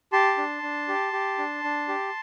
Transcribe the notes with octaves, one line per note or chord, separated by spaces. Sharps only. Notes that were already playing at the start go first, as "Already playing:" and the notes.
G4 A5 C6
D4
D4
G4
G4
D4
D4
G4